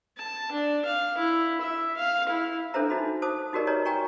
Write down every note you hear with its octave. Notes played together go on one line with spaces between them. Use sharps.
A5
D4
F5
E4
E5
F5
E4
D4 A4 B4 C5 E5 A#5
D#4 F#4 B5
C5 A5 D6 D#6
D#4 F#4 G4 A#4 D5 D#5
B4 C#5 D#5 A#5
F#4 G5 G#5 A#5 C#6